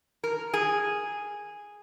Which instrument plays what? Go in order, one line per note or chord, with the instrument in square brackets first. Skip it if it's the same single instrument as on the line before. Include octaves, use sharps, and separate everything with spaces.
[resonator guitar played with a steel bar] A#4
G#4